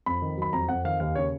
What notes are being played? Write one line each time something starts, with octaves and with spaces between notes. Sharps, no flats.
F2 B5
D#3
F#3 B5
F2 A#5
F2 F#5
D#3 F5
D#2 F5
C#3 C#5